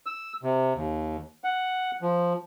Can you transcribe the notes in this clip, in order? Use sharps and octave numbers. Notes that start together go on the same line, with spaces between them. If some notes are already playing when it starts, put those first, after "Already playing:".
E6
C3
D#2
F#5
F3